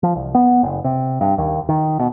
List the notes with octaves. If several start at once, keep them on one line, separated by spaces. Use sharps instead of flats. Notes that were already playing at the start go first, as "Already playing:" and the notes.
F3
C2
B3
F#1
C3
G2
D#2
D#3
B2